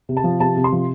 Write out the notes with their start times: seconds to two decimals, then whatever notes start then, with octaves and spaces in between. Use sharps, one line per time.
0.09 C3
0.17 A5
0.24 F3
0.40 C3 A5
0.57 C3
0.64 C6
0.72 F3